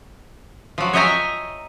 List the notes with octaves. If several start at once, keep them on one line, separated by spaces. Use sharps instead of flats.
F3 F#3
C#5 D#5 E5 G5 G#5 A#5